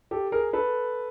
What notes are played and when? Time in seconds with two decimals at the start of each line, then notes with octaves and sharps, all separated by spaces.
0.11 G4 A4
0.32 G#4 A#4
0.53 A4 B4